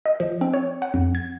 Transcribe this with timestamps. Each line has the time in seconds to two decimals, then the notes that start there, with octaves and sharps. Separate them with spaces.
0.06 D#5
0.20 F3
0.41 C4
0.54 C#5
0.82 F#5
0.94 F2
1.15 G#6